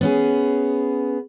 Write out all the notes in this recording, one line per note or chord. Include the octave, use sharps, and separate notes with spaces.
B3 C#4 G#4